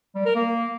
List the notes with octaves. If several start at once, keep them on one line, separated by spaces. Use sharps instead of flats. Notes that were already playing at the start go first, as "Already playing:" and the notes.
G3
A#4
A#3